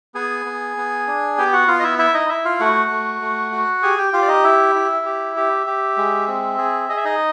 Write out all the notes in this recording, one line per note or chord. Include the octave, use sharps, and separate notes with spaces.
B3 G#4 G#5
B3
B3
D4
B3 G4 G5
F#4 F#5
B3 F4 F5
D#5
E4 E5
E4 E5
D#4 D#5
E4 E5
F4 F5
A3 F#4 F#5
A3
A3
F#4
G4 G#4 G#5
G4 G5
F4 G4 F5
D5
D#4 D#5
E4 E5
E4
G4
G4
G4
G#3
C4
G#4
G#4 D#5
E5
D#4 D#5